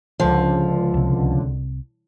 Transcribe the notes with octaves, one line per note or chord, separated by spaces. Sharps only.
C#2 D3 F3
C2 C3